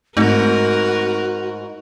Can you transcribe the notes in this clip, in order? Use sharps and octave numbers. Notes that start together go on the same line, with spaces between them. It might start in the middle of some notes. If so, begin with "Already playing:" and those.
G#2 A3 C4 D#4 F#4 A#4 B4